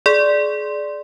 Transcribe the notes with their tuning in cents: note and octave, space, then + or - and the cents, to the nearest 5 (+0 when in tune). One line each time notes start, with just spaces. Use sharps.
G#4 +30 D5 +0 C6 +0